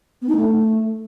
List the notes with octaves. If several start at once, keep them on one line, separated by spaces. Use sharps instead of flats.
B3
D#4
A3